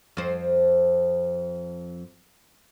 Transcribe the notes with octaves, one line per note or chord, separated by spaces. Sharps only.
F2 C5